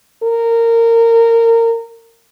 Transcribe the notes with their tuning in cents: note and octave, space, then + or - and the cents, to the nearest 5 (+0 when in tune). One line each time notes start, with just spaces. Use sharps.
A#4 -20